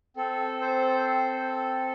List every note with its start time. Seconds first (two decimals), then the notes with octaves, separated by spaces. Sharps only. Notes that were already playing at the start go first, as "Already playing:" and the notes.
0.17 C4 A4
0.61 C5